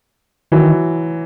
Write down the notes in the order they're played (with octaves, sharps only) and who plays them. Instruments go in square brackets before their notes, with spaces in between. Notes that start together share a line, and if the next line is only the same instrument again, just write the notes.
[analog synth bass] D#3 [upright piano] E3 F#3